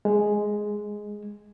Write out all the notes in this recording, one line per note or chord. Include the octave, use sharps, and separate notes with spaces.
G#3